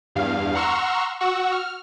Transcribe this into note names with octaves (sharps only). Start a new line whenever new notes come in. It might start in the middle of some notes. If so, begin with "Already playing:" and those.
E2 G2 F5
F#5 A#5 C6 C#6 E6 F6
F#4 F#5 C#6 E6
F6